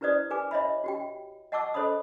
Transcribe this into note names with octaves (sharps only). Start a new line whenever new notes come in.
E4 G4 B4 C5 D5 D#6
G4 B4 G#5 D6
C#5 D#5 E5 B5
F#4 G4 G5
D#5 F#5 A5 C#6 D6 E6
A4 C5 C#5 D#5 B5 D#6